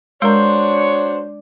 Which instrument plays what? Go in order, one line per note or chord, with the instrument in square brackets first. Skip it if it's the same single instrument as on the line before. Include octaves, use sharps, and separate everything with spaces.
[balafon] G#3 A#4 A#5 [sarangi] D4 [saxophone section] F#4 C#5 [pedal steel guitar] C5